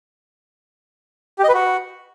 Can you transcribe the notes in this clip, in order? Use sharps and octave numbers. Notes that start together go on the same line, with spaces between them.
G4
D#5
B4
F#4